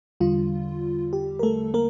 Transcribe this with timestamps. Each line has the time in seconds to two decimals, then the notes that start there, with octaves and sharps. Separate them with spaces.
0.20 E2 D3 G3 F4
1.13 G4
1.39 A#4
1.43 A3 A4
1.74 A#3 A#4